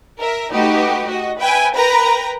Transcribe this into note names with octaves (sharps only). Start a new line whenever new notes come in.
A#4 E5
A3 D#4 F#4 G4 B4
F#4 D#5
B4 E5 G5 G#5
A#4 B4 G5 A#5 B5